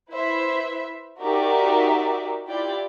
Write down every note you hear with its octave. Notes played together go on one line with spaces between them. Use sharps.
E4 B4 C5 E5
D#4 F#4 G4 A#4 D5 E5
E4 F4 G4 D5 G5